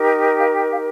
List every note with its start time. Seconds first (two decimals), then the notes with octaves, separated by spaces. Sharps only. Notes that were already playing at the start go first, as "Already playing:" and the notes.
Already playing: D#4 G4 A#4
0.39 F5
0.54 G5
0.69 F5